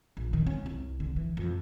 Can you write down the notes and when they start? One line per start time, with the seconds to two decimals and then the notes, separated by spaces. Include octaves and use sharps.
0.17 A#1
0.33 D#3
0.47 C#4
0.66 C2
1.00 D3
1.16 E3
1.37 F2